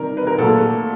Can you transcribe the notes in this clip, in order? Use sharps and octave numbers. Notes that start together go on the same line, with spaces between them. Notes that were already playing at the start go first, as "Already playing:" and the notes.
Already playing: C3 D#3 G3 A#4
B4
A#4
A#2 F#3 A3 A4